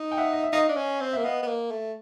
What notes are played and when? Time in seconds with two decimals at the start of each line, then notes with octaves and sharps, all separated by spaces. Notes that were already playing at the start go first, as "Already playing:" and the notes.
Already playing: D#4
0.12 G5
0.17 E5 F#5
0.33 D#5
0.43 E5
0.53 D#4 D#5 F5
0.69 D4
0.77 C#4
1.01 C4
1.13 A#3 E5
1.24 B3 D#5 F5
1.43 B3
1.48 A#3
1.71 A3